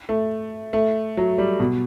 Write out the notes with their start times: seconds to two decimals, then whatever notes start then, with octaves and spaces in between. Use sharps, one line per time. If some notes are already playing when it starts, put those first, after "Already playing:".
0.09 A3
0.73 A3
1.17 F#3
1.38 G3
1.60 B2